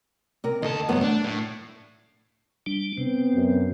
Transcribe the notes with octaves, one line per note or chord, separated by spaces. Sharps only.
C3 A#4
D2 A4 D#5 A5
E2 G2 C3 F#3 B3
A3 D4
A2
G3 D4
C3 B3 C4
F#2